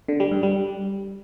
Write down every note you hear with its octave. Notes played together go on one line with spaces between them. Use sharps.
D3
G3
G2
G3